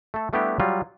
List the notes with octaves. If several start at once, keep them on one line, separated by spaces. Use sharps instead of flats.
A3 A4
G3 A3 B3 D4 E4 G4
F#3 G3 F4